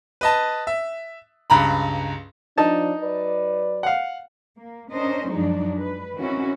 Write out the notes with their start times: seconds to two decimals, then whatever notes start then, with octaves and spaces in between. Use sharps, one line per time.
0.21 B4 D#5 A5
0.67 E5
1.50 C#2 G2 A#5 B5
2.58 F3 D4 D#4 A5
3.01 F#3 B4 D5
3.83 F5 F#5
4.61 A#3
4.92 C#4 D4 A#4 C5 D#5
5.31 F#2 F3 F#3 G#3 D4 D#4
5.80 B4
6.18 D#3 C4 C#4 E4 F#4